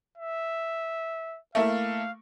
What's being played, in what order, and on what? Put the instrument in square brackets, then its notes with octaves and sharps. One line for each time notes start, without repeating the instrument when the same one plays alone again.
[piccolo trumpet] E5
[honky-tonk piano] A3 A#3 E4 [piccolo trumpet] F5